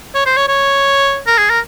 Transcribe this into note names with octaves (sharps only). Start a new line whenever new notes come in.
C#5
C5
C#5
C#5
A#4
G#4
A#4